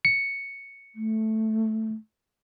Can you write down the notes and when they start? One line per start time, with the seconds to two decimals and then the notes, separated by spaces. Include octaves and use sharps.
0.05 C#7
0.95 A3